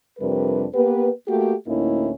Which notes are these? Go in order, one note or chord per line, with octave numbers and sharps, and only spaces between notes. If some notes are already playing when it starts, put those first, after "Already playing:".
F2 C3 G3 D4 A#4 B4
A#3 B3 G4 B4
A3 A#3 F#4 G4
D2 A2 A#3 C#4 D#4 E4